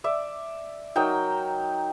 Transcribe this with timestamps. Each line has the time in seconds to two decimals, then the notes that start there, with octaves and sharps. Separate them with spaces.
0.04 D5 E5
0.96 F#3 D#4 A#4 G5